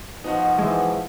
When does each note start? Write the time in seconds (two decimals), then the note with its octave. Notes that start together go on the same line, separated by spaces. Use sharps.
0.24 B2 F3 D#4 F#4 F#5
0.59 E3 G#3 E4